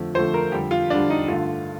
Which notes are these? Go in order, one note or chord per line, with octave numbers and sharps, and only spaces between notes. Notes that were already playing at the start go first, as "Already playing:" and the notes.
Already playing: F2 D3 F3 A3
F2 D3 F3 A3 C5
A#4
F2 D3 G3 G4
F4
F2 D3 G3 D4
D#4
G2 D3 A3 F4